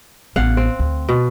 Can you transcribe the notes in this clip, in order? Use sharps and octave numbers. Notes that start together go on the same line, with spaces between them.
A1 B3 F5 F#5
C4
D2
B2